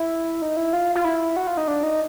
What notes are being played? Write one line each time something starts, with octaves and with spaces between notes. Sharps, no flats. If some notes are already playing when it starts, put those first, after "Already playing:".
Already playing: E4
D#4
E4
F4
F4
E4
F#4
F4
D#4
D4
D#4